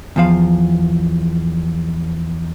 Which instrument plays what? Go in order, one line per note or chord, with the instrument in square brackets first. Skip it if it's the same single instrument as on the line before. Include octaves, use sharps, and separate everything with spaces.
[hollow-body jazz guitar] E2 F3 F5